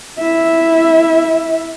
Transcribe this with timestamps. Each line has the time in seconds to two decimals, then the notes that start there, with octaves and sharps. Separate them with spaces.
0.19 E4 E5